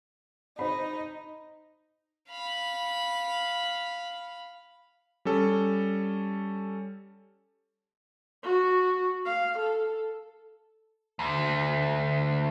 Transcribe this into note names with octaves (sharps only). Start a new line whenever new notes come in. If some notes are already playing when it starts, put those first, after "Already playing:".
D#4 C5 B5
F5 B5
G3 C#4 A4
F#4
F5
A4
D2